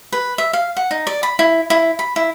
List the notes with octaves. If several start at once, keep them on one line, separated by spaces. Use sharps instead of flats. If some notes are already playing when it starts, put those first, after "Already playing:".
B4
E5
F5
F#5
D#4
D5
B5
E4
E4
B5
E4